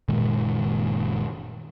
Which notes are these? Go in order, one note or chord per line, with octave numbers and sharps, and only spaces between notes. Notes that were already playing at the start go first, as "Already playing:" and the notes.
F#1 A#2 D#3 G#3